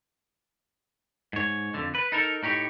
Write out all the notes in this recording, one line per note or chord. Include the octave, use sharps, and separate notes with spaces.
G#2 C#5
F2 D3
B4
D#4 A4 A#4
A2 D#4 G4 C#5